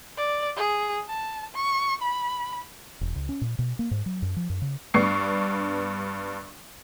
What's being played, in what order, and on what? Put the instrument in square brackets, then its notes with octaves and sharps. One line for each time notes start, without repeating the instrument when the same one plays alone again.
[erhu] D5
G#4
A5
C#6
B5
[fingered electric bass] E1
C#2
C#4
A#2
B2
A#3
G#2
F#3
F#2
F3
F#2
C#3
[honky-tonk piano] G2 B3 D4 C#6 C7